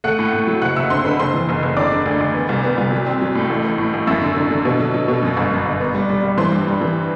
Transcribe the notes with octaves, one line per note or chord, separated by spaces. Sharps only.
A3 F#5 F#6
A2
A2
F#3
F#1 F#5 F#6
F#1 E5 E6
D3 C5 C6
D3 B4 B5
F#1 C5 C6
E3
F#1
F#1
D3 D5 D6
D3
D2
D2
B3
C2
B3
C2
F#3
C4
F#3
A2
A1
A1
A2
A1
F#2 E5 E6
D3
D3
D3
B2
F#3
F#3
B2
F#2
G1
F#2
G1
B3
G3
G3
G3
E3 C5 C6
G2
G3
E3